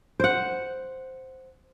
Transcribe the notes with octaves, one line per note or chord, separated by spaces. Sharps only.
C5 F#5